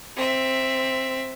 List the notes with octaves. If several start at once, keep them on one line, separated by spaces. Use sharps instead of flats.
C4 E5